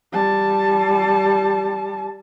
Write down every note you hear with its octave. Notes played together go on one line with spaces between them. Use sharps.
G3 A5